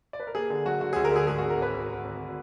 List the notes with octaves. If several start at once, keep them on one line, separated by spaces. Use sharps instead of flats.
D5
B4
A#4
A#3 G#4
D3 G#4
F#3 F#4
D3 F#4
G#4
D2
A#4
D3 G#4
G#2 G#4
F#4
G#1
A#4
G#1 B4
G#1
G#1
G#1